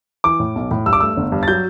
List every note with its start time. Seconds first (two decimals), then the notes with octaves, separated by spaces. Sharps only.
0.24 E3 D6
0.40 A2
0.55 B1
0.71 A2
0.86 G2 E6
0.93 D6
1.00 A3 E6
1.17 G1
1.32 G2
1.43 A6
1.48 F#3 G6